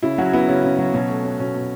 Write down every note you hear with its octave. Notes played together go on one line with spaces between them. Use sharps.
C#3 E4
F#3 C#4 F#4
B3 E4
C#3 C#4
C#3
F#3
B2 C#4
A3
C#4
B2 C#4
B2